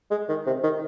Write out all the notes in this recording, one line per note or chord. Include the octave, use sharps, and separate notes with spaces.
G#3
D#3
C3
D#3